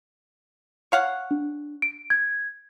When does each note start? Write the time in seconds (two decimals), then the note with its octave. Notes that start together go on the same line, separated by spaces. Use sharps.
0.92 C#5 F5 F#5
1.31 D4
1.82 D7
2.10 G#6